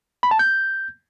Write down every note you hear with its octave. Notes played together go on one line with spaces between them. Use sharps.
B5
A5
G6